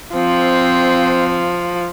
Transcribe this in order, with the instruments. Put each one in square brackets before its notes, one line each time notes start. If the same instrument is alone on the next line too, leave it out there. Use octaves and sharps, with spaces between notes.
[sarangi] F3 [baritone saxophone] C4